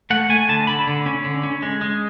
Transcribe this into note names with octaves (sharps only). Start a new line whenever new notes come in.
A3 F#5
A3 G#5
D3 A5
D3 B5
D3
C#4
D3
C#4
G#3
G#3